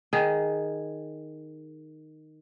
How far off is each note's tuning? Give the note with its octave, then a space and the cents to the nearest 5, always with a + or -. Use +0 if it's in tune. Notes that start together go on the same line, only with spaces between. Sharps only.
D#3 -5 G#4 +0